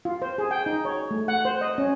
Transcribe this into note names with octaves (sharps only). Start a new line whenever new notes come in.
F4
C5
G#4
G5
D#4
C#5
A3
F#5
C5
D#5
C#4